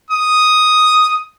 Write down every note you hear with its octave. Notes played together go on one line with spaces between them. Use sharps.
D#6